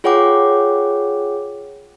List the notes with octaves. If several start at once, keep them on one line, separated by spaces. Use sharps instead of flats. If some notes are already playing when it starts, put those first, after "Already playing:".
F4 G#4 C#5 F#5 G5 D6